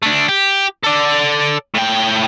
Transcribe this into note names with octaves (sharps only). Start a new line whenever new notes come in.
A3 D4
G4
A4 D5
A2 G5